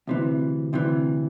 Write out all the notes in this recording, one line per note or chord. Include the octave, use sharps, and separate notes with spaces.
D2 C3 E3
D2 C3 E3